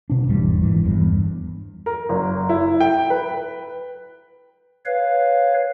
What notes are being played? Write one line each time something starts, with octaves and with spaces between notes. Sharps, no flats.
B2 D4
G#1 E2 C3 G3
F#1 G#2 E3
E2 G2
A#4
F#1
E4
G5
B4
B4 C#5 F5